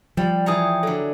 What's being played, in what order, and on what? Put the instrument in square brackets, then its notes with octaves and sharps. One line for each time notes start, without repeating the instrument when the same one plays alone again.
[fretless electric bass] F3 [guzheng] G3
[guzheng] E3 G#4 A#5 [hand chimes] G5 D#6
[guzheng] D3 F#3 [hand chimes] A4